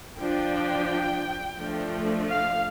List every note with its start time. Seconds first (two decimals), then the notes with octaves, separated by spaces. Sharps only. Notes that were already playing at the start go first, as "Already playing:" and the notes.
0.19 F3 D4 G5
1.59 F3 A3 D4
2.29 F5